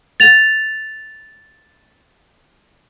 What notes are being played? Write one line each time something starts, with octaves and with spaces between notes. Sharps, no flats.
A6 F7